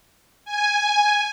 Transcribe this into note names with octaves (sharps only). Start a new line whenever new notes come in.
G#5